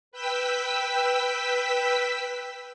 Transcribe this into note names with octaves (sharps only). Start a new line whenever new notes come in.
B4 G5 E6 B6